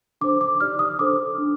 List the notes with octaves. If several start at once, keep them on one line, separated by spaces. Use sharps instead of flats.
D4 A4 C5 D6
D6
D#4 G4 D5 F6
D#6
D4 A4 C5 D6
D4 A4